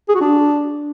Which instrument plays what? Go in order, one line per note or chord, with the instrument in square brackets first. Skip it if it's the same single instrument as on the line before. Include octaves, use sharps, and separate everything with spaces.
[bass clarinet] G#4
F#4
D4